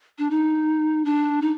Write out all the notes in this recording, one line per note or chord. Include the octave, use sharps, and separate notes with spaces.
D4
D#4
D4
D#4